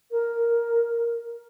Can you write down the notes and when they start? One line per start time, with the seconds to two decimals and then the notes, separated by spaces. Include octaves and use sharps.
0.11 A#4